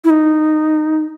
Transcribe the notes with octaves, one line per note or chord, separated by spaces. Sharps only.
E4
D#4